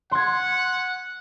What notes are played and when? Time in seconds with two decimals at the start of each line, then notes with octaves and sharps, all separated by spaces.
0.11 F#5 C6 G#6